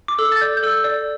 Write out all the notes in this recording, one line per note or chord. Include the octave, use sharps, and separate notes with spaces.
D6
A4 E6
A6
D5 G6
G6
A4 E6
D5